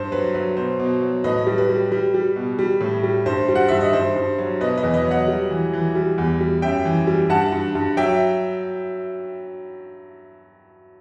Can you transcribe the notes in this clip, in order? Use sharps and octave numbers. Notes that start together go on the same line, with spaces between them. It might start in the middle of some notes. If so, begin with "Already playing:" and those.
Already playing: G2 C5
F#3 B4
F#3 B4
B2 C5
B2
F#3
A2 B4 D#5
G3
B4
G3
G3
G3
B2
G3
A2
G3
G2 C5
G3
F#5
G2 E5
D#5
G2 C5
G2
F#3
B2 B4 D#5
B4 D#5
E2
B4 D#5
F#3
D#5 F#5
G3
E3
E3
G3
E2
G3
F#2 E5 G5
E3
G3
G2 F#5 A5
G2
G2
F#3 E5 G5